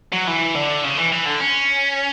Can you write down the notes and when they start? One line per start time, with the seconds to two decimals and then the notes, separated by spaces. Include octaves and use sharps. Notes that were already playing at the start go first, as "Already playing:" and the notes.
0.13 F#3
0.27 E3
0.55 D3
0.84 C#3
0.98 E3
1.12 E3
1.26 D3
1.41 C#4